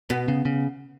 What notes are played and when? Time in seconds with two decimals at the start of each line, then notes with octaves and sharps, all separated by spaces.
0.10 B2 B3
0.28 C#3
0.45 C#3